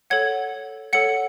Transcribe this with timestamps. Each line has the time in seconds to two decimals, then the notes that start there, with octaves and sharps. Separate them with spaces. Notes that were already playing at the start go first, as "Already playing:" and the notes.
0.10 A4 C#5 F#5 G#6
0.93 A4 C#5 F#5 C#7